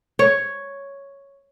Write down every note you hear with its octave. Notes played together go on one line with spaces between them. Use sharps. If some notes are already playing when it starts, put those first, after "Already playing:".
C#5